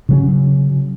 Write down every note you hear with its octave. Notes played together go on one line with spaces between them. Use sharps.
C#3 F#3 C#4